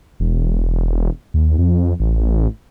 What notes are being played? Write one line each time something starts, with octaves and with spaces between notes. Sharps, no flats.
E1
D#2
F2
A1